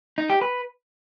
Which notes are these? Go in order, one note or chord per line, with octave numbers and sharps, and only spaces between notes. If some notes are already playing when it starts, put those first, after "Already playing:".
D#4
G4
B4